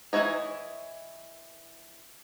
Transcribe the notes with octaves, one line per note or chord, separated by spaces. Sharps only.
E3 D4 E4 C#5 D#5